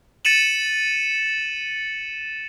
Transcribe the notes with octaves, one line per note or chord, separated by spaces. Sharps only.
A6 C#7 D#7 E7 F#7